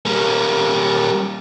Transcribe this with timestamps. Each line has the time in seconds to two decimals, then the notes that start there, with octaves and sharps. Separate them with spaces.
0.06 G3 A#3